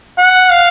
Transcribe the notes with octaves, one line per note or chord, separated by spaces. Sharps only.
F#5
F5